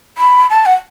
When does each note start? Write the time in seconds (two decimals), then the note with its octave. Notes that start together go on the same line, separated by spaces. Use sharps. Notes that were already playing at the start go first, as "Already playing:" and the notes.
0.18 B5
0.50 A5
0.66 F#5